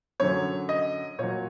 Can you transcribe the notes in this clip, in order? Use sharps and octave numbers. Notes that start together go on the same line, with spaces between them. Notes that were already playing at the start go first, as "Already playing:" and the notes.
F#2 D3 F#3 C#5
D#5
A#2 F#3 C#5